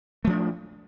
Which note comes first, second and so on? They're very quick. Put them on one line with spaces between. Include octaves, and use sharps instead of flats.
A3 F3 D4